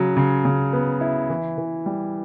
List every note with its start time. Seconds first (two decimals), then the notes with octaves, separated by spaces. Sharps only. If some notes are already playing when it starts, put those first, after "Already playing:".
Already playing: C#3 F#3
0.17 C#3
0.45 C#3
0.73 B3
1.01 E4
1.30 E3
1.58 E3
1.86 G3